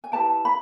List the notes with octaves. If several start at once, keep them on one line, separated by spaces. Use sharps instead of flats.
G#5
E4 G4 B4 G5 A5
B5